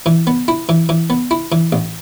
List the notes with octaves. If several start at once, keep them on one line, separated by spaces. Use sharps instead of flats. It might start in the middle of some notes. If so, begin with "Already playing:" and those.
E3
B3
E4
E3
E3
B3
E4
E3
A1